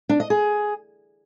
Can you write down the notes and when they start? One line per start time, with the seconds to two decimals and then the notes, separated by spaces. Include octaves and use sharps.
0.09 D4
0.20 D#5
0.30 G#4